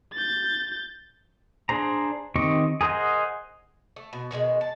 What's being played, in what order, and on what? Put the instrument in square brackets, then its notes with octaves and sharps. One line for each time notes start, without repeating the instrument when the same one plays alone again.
[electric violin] G6 A6
[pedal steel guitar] D4 G#4 C5 A#5
D#3 C4 G4 D#5 C#6
G#4 A#4 C5 D#5 F#5
[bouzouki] A3
B2
B2 D#3 F#3 G#3
A5